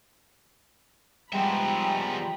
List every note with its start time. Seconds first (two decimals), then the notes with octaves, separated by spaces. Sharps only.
1.33 F3 G3 G#3 B3 E5 G5 A#5 B5